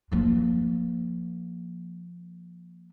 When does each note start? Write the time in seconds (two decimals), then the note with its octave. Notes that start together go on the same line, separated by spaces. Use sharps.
0.12 F3 A#3